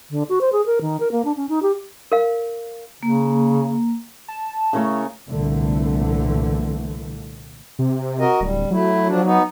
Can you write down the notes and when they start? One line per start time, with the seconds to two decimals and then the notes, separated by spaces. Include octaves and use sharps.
0.10 D3
0.29 F#4
0.41 C5
0.53 G#4
0.66 A#4
0.81 D#3
1.00 A#4
1.12 A#3
1.25 D4
1.37 C#4
1.49 D#4
1.62 G4
2.12 A#4 F5
3.03 C#3 A#3
4.28 A5
4.73 C#3 A3 E4 A#4 C#5 E5
5.30 C2 A#2 D3 E3 A3
7.79 C3
8.20 F#4 A#4 D#5
8.40 D1 G3
8.71 F#3 A3 E4
9.08 F3 D4
9.25 B3 D#4